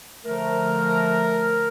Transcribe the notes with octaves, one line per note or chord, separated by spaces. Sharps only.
D3 F3 A3 A#4